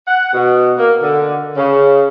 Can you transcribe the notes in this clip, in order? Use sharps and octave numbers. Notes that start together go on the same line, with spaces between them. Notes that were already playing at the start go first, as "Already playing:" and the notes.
F#5
B2
A#3
D3
C#3